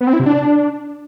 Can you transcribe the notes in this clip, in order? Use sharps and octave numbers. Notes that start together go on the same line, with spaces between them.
B3
C4
E4
C3
D4